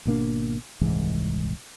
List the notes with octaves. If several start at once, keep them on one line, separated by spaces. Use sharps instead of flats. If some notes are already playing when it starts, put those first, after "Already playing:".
G#1 B2 A#3 D4
D#1 C2 G#2 E3